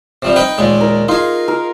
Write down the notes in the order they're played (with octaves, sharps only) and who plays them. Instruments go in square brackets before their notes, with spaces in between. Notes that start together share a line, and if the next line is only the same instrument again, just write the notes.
[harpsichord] C3 F3 G3
D#4 B4 G5
D#2 A#2 G#3
[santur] A#4
[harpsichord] D#4 G#4 [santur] F4
[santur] A#4